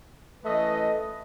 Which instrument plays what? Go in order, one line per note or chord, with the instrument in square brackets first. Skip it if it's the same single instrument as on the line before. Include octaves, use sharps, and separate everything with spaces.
[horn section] E3 A3 C#4 B4 D#5